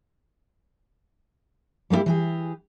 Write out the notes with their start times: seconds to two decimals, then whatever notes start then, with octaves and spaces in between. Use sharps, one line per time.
1.90 G3 A#3 C4 E4 G4
2.06 E3 G4 G#4